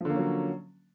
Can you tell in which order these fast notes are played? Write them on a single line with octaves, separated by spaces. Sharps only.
F3 D3 A#3 C#4 F#3